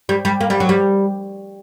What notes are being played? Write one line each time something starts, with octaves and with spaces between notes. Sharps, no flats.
G3
G3
A#3
G3
F#3
G3